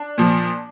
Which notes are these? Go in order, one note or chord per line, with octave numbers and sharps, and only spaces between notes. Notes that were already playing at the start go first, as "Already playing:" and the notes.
Already playing: D4
A#2 F3